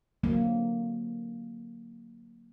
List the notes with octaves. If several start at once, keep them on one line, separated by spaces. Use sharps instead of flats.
D3 F#3 A#3 C4